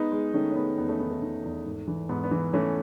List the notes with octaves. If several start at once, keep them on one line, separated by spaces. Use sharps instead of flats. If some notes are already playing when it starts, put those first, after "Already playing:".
Already playing: G#3 B3 D#4
G#3
D#3 A3 C#4
C#4
G#3 B3
E2 B3
A3 C#4
D#3 B3
A3
D#3
E2
G#1
E3
G#2 B3
B3
E3
E3 A3 C#4